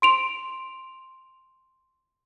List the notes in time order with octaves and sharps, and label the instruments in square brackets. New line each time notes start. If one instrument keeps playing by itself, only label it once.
[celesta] C6 D7 F7